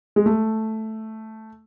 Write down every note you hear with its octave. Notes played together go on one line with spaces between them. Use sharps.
G#3
A3